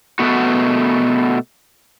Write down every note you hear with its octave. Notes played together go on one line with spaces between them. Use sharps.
B2 F3 A3 B3 F#4